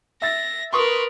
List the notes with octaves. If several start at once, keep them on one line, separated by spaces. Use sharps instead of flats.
E5 A6 A#6
A#4 B4 C6 C#6 D#6